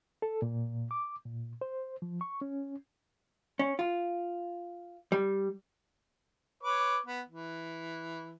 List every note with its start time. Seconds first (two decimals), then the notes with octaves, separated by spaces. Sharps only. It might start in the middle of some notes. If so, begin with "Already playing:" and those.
0.22 A4
0.42 A#2
0.91 D6
1.25 A#2
1.61 C5
2.02 F3
2.21 C#6
2.41 C#4
3.59 C#4
3.79 F4
5.12 G3
6.63 B4 C#5 D6
7.06 B3
7.29 E3